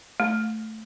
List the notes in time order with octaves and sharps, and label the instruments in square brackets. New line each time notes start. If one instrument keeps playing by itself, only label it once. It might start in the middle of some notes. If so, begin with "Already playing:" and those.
[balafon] A3